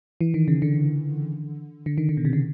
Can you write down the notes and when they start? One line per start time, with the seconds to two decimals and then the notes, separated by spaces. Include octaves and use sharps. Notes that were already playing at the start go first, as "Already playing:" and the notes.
0.21 E3
0.34 D#3
0.48 C#3
0.62 D3
1.86 D3
1.98 D#3
2.09 D3
2.17 B2
2.25 C3
2.33 C#3